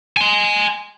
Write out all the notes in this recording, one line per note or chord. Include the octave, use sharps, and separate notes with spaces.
G#5 C6